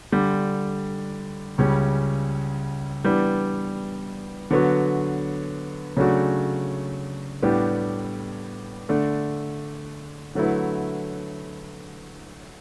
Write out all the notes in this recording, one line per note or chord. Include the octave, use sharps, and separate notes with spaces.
D3 G3 D4
C#2 C#3 G3 C#4
E3 G3 B3 D4
D3 F#3 B3 F#4
C#3 F#3 A3 D4 F#4
A2 G3 B3 D4 G4
D3 A3 D4
D3 F#3 A3 E4 B4